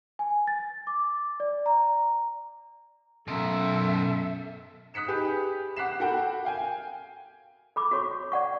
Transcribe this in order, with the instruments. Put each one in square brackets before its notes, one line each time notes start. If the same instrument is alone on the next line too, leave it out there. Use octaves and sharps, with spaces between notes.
[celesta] G#5
A6
D6
D5
A#5
[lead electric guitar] B2 A#4 [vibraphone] F#3 C#4 C6 [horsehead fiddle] A4 E5
[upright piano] D#6 F#6 B6 C#7 E7
D#4 G4 G#4 B4
F#5 D6 F#6 B6 C7 E7
F#4 A4 A#4 F#5 G5 B5
F5 G5 G#5
[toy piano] A4 B5 D6
F#4 A4 C#5 C#6
D5 F#5 C#6